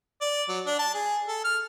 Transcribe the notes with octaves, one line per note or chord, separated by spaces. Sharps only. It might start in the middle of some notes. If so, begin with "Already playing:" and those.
D5
F#3
D4
A5
G#4
A4
F6